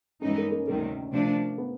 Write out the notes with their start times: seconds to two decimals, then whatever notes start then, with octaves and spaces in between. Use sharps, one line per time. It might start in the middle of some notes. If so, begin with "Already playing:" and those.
0.22 G2 E3 G#3 B3 C#4 D#4
0.38 A#3
0.52 A#3
0.67 D2 C3 D#3 G3 A#3
1.12 C3 F3 A3 D4
1.58 B3